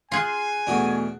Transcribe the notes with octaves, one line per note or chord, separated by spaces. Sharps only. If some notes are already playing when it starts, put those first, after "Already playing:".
F4 G#4 G#5 C6 F#6 C7
E2 B2 A3 D4 F#4